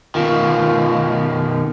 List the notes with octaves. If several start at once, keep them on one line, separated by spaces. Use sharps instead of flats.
B2 D#3 F4